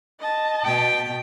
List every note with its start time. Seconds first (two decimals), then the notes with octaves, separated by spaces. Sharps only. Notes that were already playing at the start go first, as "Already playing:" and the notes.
0.20 D#5 A5
0.65 B2 G5